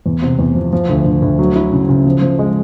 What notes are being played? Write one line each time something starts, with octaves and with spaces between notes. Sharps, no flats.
E2
C3
E2
F3
F3
D2
D2
D2
F#3
E4
C#3
C#3
F3
F3
G#3